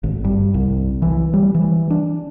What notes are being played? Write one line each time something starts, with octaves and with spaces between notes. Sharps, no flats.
G#1
G2
C2
E3
G3
E3
D4